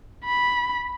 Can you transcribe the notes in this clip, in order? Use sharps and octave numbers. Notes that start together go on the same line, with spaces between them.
B5